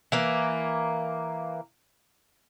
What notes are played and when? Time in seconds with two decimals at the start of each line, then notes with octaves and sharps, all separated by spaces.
0.12 E3 A#3